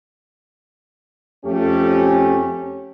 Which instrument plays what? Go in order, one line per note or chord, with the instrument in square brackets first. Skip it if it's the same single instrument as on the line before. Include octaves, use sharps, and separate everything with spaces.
[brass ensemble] F2 A3 C#4 G4